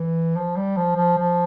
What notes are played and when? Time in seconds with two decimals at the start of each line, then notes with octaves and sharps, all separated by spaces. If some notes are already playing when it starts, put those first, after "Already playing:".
Already playing: E3
0.36 F3
0.57 G3
0.77 F3
0.96 F3
1.18 F3